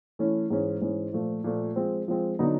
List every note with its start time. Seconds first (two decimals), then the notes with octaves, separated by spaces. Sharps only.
0.19 E3 A3 C#4 E4
0.50 G#2 E3 G#3 C#4
0.82 G#2 E3 G#3 C#4
1.13 A#2 F3 A3
1.44 A#2 F3 A3
1.76 F3 G#3 C4
2.08 F3 G#3 C4
2.39 D3 F#3 B3 D#4